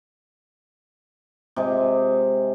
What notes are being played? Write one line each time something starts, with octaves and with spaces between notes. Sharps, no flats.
C3 G#3